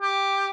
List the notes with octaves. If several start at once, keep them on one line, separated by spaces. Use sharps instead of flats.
G4